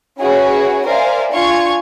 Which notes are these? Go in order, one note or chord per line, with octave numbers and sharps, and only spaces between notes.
C#4 E4 F#4 G#4 B4 C#5
A#4 C5 D5 E5 F5 G#5
D4 F4 G#5 C#6 G#6